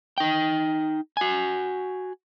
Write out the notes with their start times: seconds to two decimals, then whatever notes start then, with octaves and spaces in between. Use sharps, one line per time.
0.18 D#4 G5
1.17 F#4 G#5